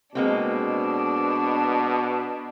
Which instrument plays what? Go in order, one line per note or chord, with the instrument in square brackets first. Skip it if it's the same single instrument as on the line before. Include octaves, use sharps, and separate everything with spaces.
[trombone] B2 [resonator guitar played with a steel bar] G#3 A#3 C4 [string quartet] D4